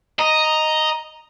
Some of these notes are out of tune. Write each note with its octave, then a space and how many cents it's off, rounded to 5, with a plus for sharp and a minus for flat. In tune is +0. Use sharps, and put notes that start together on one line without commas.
D#5 +0 A#5 +0